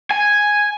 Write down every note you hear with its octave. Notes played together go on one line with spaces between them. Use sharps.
G#5